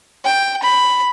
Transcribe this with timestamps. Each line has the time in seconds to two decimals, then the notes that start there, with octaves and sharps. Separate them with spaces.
0.25 G5
0.63 B5